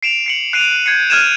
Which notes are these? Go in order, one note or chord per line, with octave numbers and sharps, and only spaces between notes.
C7 D7 E7 F7
C7 C#7 F#7
F#6 C7 D7 D#7 F7
G6 G#6 C7 C#7
F6 F#6 G#6 D#7 E7